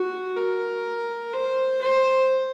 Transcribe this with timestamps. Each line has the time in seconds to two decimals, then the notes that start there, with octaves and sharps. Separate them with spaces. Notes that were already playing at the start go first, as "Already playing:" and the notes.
Already playing: F#4
0.37 A#4
1.33 C5
1.81 C5